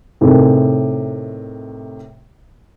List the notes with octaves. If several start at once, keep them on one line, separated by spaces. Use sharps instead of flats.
A2 C3 D#3 G#4